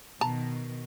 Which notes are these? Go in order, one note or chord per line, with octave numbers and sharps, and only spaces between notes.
B2 D#3 A5 A#5